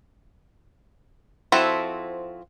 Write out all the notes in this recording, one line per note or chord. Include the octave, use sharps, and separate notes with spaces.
F3 C4 E4 F#4 A4